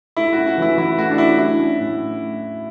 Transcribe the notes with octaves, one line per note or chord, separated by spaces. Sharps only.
A3 E4
F#4
C#4
F#4
E3 E4
E3 E4
A3 F#4
D4
C#4 E4
F#3 E4
C#4
A2